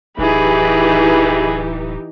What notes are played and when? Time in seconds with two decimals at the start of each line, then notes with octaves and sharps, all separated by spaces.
0.19 D1 E3 D#4 G4 G#4 B5